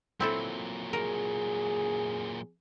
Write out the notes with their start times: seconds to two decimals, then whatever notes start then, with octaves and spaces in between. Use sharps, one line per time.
0.20 A#2 F#3 C4 E4 A4
0.93 G#4 A#4